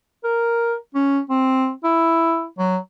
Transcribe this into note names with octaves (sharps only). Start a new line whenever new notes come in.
A#4
C#4
C4
E4
F#3